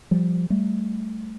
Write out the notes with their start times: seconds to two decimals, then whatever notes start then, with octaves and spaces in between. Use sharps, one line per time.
0.11 F3 G3
0.50 G3 A3